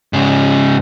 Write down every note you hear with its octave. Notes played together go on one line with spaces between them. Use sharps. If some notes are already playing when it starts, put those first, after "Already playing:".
G#2 C#3